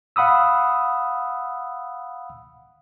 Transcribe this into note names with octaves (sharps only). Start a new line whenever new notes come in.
F5 F#5 B5 D#6 E6